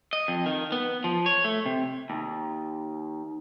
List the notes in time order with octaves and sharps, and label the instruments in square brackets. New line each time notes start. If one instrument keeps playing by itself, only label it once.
[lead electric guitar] D#5
F2
D#3
B3
F3
C#5
A3
C3
[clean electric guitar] D#2